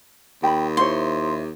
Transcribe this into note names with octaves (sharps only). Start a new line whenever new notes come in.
D#2 G5 B5
E4 C5 C#5 C6